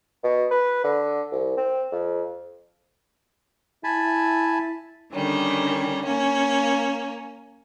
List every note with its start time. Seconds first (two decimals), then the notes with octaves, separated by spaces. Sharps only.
0.24 B2
0.51 B4
0.84 D3
1.32 C2
1.57 C4
1.92 F2
3.84 E4 G#5 A5 B5
5.13 D3 D#3 G3 C#4
6.04 A#3 C#4